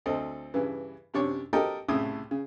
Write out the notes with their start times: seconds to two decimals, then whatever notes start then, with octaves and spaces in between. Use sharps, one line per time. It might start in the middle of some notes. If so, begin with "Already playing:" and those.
0.06 D2 C4 A4 D#5
0.54 G2 C#3 E3
1.14 F#2 C3 D4 C#5
1.53 G4 A4 A#4 D#5 G5
1.88 C2 A2 C#3 A3 D#6
2.31 C#3